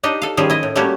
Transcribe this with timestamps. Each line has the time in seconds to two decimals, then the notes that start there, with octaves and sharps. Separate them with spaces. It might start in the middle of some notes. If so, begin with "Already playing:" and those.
0.03 D4 D#4 G4 D#5
0.22 A4 F5
0.37 D#3 F3 G3 C#4 G#4 C5
0.50 E4 D#5
0.63 A2
0.76 G3 A3 A#3 C#4 F#4 G4